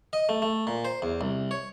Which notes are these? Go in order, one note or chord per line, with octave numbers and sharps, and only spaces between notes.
D#5
A3
A3
A#2
C5
E2
C2
C#5